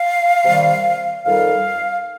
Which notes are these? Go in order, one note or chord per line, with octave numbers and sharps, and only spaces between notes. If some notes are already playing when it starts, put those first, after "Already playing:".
Already playing: F5
C3 D#3 G3
F2 D#3 G3 F5